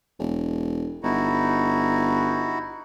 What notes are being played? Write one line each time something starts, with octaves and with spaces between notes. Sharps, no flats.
E1
G1 D#4 E4 F#4